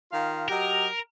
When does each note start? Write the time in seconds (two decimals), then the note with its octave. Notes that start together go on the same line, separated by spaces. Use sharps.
0.11 D#3 F4 F5
0.48 F#3 G4 A#4 D#5